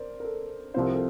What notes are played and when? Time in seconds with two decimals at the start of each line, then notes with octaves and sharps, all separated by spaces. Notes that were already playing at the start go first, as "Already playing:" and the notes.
Already playing: A#4 C5 D5
0.20 A#4
0.24 A4
0.74 C2 C3 F3 C4 C5
0.84 A#4
0.94 A4